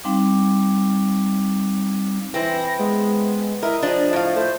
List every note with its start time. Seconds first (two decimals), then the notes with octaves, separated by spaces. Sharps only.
0.04 G3 C4 D#4 F5 D6
2.34 E3 C4 E4 A#6
2.79 G#3 B3
3.63 E4 A#4 D#5
3.82 F3 D4 G#4
4.13 A2 F5
4.36 A3 C5